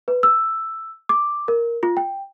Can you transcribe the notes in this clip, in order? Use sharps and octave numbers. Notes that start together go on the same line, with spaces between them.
B4
E6
D6
A#4
F4
G5